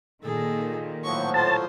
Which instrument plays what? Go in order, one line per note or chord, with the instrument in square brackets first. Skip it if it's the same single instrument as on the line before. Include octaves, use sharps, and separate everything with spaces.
[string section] A#2 D#3 [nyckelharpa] G#4 A4
[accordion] A2 F3 F#3 [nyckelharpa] C#6
[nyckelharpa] F4 C5 [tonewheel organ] A5